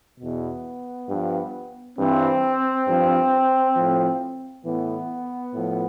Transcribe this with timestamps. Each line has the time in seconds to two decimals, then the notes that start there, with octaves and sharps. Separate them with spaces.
0.19 E2 B2 B3
1.08 G2 F3
1.98 G2 E3 C4
2.87 G2 F3
3.76 A2 F3
4.65 A2 E3 B3
5.53 A2 F3